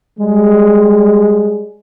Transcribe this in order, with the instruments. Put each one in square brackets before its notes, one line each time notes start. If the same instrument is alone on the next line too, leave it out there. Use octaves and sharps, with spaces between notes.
[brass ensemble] G3 G#3